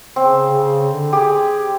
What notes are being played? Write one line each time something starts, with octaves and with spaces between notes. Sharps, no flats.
C#3 C4
C#3
D3
G4 G#4